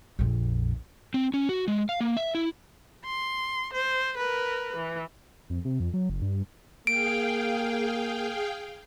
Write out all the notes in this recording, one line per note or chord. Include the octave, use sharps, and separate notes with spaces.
A#1 F2
C4
C#4
F#4
G#3
F5
A#3
E5
E4
C6
C5
A#4 B4
E3
F2
C3
F2
F#3
F#1
G2
A#3 G#4 F5 G5 D7